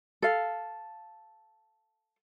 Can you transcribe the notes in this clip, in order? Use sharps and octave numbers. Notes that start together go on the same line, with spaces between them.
A4 F5